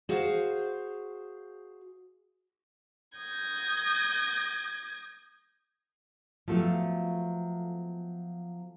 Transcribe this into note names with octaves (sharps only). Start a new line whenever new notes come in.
F#4 G#4 C5 F5
D#6 G6 G#6 A#6
F3 F#3 A3 B3 F4